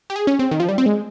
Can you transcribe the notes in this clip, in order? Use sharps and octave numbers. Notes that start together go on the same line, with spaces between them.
G4
G#4
C#4
C4
D#3
F3
G3
C4
G#3